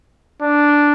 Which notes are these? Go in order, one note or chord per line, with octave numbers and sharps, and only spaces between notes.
D4